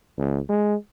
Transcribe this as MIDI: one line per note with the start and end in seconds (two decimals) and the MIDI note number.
0.18 0.39 37
0.49 0.75 56